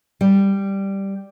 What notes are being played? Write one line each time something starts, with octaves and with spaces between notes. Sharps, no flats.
G3